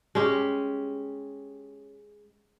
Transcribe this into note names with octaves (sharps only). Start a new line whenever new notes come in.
G#3 C#4 G4